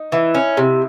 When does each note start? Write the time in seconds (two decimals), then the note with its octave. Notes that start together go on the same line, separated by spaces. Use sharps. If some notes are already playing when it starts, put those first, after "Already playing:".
Already playing: D#4
0.12 E3 E4
0.35 C#4
0.57 C3